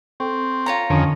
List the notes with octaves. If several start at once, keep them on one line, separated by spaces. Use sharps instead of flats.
C4 A4 G5 C#6
F4 C#5 A#5
F2 D3 D#3 C#4